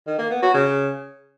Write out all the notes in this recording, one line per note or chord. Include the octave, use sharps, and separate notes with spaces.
D#3
A#3
B3
F#4
C#3